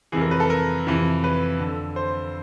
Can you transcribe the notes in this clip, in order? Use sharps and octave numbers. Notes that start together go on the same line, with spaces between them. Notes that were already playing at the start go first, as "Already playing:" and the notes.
F2 C3 E3 G#4
A#4
B4
A4
A#4
F2 C3 E3
B4
F2 D3
C5